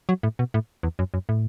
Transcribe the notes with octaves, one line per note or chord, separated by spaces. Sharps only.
F#3
A2
B2
A2
E2
F#2
F#2
A2